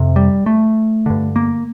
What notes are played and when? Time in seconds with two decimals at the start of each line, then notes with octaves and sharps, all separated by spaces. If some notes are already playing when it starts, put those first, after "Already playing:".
Already playing: F2 C3
0.16 G3
0.46 A3
1.06 G2 D3
1.36 A#3